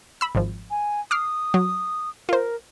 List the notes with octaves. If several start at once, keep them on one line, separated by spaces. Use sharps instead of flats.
B5 E6
G#1 F3
G#5
D6 D#6 F6 C7
F#3
F4 A#4 C5